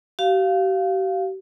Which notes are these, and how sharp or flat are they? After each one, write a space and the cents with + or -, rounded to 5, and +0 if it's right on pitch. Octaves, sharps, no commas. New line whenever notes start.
G4 -40 F5 +0